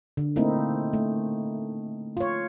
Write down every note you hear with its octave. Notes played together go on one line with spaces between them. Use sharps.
D3
A3 A#3 C4 D#4 E4
A3
F4 C#5